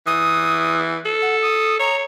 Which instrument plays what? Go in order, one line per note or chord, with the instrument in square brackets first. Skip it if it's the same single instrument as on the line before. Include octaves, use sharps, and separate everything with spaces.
[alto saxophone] E3 [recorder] D#6
[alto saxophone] A4
[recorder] F#5
D#6
[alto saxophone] C#5 [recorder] A#5